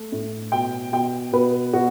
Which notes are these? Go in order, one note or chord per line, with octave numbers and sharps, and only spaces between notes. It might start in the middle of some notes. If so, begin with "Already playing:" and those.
Already playing: A3
A2
B2 G5
B2 G5
B2 B4
B2 F#4